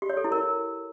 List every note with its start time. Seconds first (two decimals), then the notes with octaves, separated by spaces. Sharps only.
0.02 G4
0.10 C#5
0.17 A4
0.24 E4
0.32 A#4